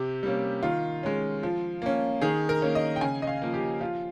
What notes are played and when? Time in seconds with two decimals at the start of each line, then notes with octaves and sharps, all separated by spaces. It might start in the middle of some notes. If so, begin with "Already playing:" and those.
Already playing: C3 G4
0.23 G3 A#3 C#4
0.63 D#3 F4
1.03 G#3 C#4
1.43 F3
1.82 A#3 C#4
2.21 D#3 G#4
2.49 A#4
2.62 A#3 C#4
2.75 D#5
2.96 G5
3.01 C#3 G#5
3.22 D#5
3.27 F5
3.42 F3 A#3
3.54 G4
3.81 F3 F4